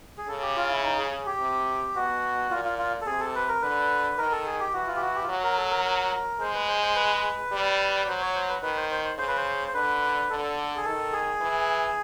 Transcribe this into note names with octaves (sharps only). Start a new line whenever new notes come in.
G#4
C#3 A4
G4
F4
E4
D#4
G#4
G#4
G4
C3
B2 F#4
A#2 F4
F4
F4
A4
C3 G#4
A4
B4
A#4
D3 B4
D#3 A#4
A4
G#4
G4
E3 F#4
F4
G4
F#4
G4
F4
F#3 F#4
A#4
A4
A#4
A#4
G#3 C5
B4
C5
C5
B4
G3
F#3 C5
C#5
C5
B4
D#3 B4
C5
C5
C5
C#3 C5
B4
C5
C5
D3 B4
D3 A4
G#4
D#3 A4
G#4
E3